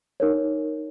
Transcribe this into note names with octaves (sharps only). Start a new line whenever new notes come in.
D#4 A#4 C#5